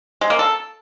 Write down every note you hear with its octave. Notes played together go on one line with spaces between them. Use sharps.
G#3
A#3
A4